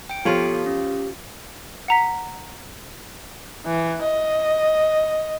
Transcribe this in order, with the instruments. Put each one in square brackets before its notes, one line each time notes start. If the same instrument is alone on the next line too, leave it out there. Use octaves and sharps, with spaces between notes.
[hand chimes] G5 D7
[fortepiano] F3 [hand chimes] B3 A4 C6 [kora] F4 C#5 [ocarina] G4
[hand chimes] C#4
[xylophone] F#5 A#5 B6
[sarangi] E3
D#5